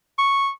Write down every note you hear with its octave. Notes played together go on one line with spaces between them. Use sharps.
C#6